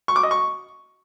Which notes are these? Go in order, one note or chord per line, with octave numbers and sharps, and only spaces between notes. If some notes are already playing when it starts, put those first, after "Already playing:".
C#6
D6
D#5
C#6